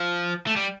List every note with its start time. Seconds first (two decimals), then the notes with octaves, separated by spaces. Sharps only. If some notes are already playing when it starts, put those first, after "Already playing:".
Already playing: F3
0.47 A3
0.56 G3